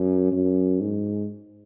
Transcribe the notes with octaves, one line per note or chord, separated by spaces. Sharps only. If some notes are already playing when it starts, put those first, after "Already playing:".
Already playing: F#2
F#2
G#2